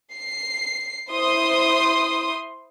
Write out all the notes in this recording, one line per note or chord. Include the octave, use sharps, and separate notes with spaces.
C7
E4 C5 C6 D#6